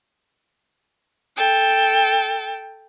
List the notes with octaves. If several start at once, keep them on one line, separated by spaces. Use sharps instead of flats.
A4 G5